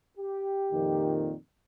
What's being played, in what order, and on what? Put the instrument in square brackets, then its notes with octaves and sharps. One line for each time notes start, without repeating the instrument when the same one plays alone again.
[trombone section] G4
[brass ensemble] F2 A#2 D#3